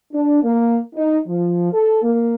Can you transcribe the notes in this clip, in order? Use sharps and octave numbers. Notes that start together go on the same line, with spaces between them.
D4
A#3
D#4
F3
A4
A#3